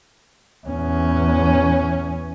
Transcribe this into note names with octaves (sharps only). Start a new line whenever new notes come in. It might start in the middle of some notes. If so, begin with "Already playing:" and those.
E2 C#4